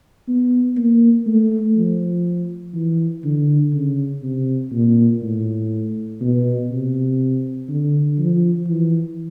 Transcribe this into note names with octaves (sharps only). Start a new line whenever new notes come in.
B3
A#3
A3
F3
E3
D3
C#3
C3
A#2
A2
B2
C3
D3
F3
E3